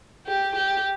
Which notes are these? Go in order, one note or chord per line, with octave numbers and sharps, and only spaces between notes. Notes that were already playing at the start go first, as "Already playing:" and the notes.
G4
G4